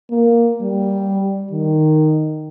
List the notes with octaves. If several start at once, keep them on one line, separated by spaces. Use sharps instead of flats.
A#3
G3
D#3